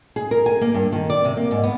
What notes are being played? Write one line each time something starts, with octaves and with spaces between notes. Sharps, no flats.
G#4
A#4
G#5
A#3
G2
D#3
D5
C3
A#3
G#2
B3